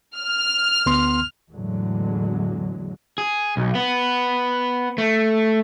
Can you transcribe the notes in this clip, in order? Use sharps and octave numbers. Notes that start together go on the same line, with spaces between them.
F6
D2 B3 C6
E2 A2 D3 F#3 G#3
G#4
B1
B3
A3